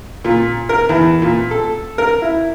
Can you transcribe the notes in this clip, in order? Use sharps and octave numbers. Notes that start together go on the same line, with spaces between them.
A#2
A#4
E2
A#2
A4
A#4
E4